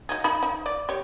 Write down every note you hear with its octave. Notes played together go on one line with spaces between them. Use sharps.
F#3 D#4 G#4
D#4 F5 B5
D#4
D5
G4 C#5